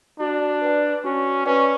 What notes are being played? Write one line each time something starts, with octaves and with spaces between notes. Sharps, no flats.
D4 F#4
B4 D5 G5
C#4 F#4
C#4 B4 D5 G5